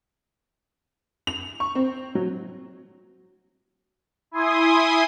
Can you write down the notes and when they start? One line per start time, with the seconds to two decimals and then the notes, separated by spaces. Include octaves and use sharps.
1.27 F7
1.60 C#6
1.75 C4
2.15 F#3
4.31 E4 G#5 C6 D#6